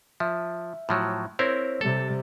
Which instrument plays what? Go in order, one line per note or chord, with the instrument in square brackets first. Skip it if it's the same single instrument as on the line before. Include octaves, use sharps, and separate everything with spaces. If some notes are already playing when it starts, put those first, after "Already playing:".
[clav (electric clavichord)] F3 [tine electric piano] E5
[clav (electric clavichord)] A2 F3 F#3
[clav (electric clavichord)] C4 E4 A#4 [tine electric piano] C5 C#5
[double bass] C3 G3 [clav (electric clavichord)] A4 [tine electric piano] A6